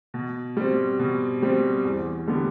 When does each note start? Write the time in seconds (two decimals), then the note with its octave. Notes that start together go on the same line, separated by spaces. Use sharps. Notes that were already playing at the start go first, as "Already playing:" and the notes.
0.14 B2
0.57 G3 C4
0.99 B2
1.42 G3 C4
1.85 E2
2.27 D3 G3 B3